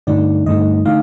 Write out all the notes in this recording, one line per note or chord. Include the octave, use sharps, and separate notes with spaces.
G2 D3 A3 D#4 D5
G2 D3 A3 D#4 D#5
D3 A3 D#4 F5